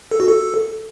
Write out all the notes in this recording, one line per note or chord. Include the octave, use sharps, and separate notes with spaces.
A4
F#4
A4